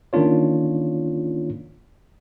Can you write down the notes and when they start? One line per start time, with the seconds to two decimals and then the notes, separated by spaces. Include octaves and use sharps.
0.13 D#3 A#3 C#4 D4 F4 C#5